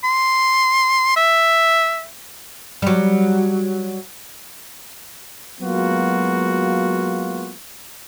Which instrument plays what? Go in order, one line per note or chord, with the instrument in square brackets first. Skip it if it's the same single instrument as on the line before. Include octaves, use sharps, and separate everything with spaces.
[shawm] C6
E5
[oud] F#3 G3
[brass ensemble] F#3 G#3 A#3 B3 F4 F#4